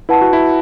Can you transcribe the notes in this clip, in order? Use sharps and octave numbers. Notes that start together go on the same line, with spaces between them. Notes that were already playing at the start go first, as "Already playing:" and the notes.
E4 B4 F#5 A5
F#4
E4